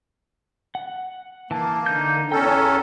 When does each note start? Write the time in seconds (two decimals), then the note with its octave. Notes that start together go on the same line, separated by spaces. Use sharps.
0.75 F#5
1.51 E3 A#3 A5
1.86 D3 D#4 G6
2.32 E2 C#4 A4 G5 A#5